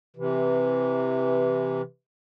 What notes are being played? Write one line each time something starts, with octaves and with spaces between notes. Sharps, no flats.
C3 E3